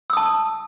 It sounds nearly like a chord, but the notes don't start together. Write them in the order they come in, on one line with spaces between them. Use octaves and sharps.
E6 D#6 A5